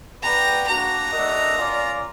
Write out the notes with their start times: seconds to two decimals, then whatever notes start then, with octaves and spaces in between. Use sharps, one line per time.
0.22 F#4 B4 D5 G5 A#5
0.67 A#3 D4 F#4 A#5
1.12 A3 D4 F#4 A#4 D#5
1.57 C#4 F4 A#4 D5